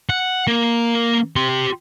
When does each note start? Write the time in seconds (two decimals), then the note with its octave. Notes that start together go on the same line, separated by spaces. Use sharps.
0.09 F#5
0.47 A#3
1.36 G4 C6